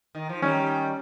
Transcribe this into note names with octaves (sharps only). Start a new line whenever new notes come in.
D#3
F3
D#3 G3 C#4